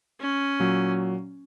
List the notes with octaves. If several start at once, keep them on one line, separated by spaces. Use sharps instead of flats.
C#4
A#2 F#3